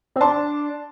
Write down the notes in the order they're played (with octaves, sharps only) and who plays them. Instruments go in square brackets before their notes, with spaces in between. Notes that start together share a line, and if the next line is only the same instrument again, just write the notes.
[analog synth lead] C4
[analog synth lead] D4 [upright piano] A5 C6